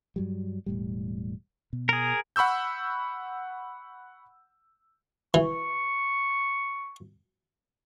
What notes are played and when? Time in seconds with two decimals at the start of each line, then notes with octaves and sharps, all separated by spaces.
0.16 G2 F#3 G3
0.66 E1 A2 G3
1.73 B2
1.89 G#4 A#4
2.36 F#5 B5 C#6 E6 G6
5.34 E3 C#6